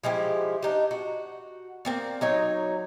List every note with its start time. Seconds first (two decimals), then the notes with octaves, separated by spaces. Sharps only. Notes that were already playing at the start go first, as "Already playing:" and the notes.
0.04 F3 G#3 E4 G4
0.63 D4 D#4 G4
0.91 F#4
1.85 A#3 C4 D5
2.21 F#3 D#4 C#5